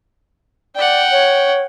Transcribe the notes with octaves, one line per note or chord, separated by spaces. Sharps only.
D5 F#5 G5
C#5